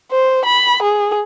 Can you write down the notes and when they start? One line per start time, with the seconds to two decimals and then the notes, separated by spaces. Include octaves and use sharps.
0.12 C5
0.45 B5
0.83 G#4